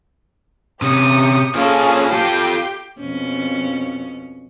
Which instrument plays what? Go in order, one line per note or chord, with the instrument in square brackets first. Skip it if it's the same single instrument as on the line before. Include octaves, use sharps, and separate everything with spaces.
[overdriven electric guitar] C3 C#4 [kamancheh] G4 [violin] D#6 C#7
[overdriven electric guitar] F3 A#3 [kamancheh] C#4 G#4 [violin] F4 A4
[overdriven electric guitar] F4 A4 [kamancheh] G4 G5 [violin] C7
[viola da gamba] F2 B2 C#4